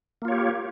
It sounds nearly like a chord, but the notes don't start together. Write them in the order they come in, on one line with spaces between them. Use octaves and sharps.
A#3 F4 C#5 G4